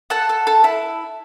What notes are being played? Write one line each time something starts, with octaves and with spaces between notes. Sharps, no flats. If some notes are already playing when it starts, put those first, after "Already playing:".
A4 F#5 A5
A4
A4
E4